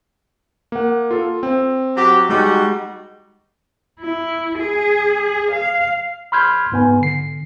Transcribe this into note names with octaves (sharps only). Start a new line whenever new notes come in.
A#3 F#5
F4 A4
C4
F#3 F#4 G4
G3 G#3 D#4 F#4 D6
E4
G#4
F5
B5 C6 F6 G6 G#6
G#2 B3 G#5
D3 C7